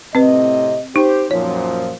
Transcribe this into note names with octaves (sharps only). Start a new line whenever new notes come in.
A2 C3 C4 B4 D#5
D#4 G4 C5
F#2 A#2 F3 C#5